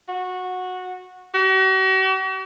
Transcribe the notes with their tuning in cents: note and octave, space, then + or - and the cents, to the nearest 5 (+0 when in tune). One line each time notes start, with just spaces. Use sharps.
F#4 -15
F#4 +45